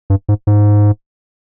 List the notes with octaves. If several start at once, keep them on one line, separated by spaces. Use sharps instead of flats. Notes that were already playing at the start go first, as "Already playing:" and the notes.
G2
G#2
G#2